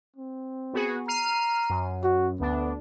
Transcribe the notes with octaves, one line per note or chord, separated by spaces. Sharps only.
C4
B3 F#4 G#4
A#5 F6 C7 D#7
F#2
F#4
D2 B3 D4